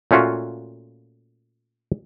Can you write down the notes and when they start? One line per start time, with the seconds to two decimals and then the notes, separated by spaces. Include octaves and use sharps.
0.11 A#2 A3 C#4 F4 F#4